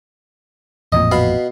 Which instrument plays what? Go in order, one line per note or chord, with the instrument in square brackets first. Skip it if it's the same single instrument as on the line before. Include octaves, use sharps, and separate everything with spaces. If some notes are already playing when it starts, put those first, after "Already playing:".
[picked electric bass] A1 F2 A#2 [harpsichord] D#5
[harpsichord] B2 F5 B5